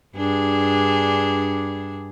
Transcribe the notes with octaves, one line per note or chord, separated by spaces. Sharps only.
G2 D4 G#4